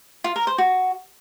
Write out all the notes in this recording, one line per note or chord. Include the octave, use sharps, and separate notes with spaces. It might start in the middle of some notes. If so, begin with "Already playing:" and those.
F4
A#4
C5
F#4